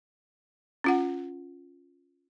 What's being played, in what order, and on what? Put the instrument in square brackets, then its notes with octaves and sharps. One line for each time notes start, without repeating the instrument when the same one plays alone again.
[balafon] C#4 F4 F#5